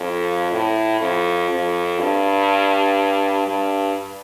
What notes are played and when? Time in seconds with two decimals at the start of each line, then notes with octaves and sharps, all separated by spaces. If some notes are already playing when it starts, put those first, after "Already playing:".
Already playing: F2
0.52 A2
1.01 F2
1.50 F2
1.99 G2
3.47 G2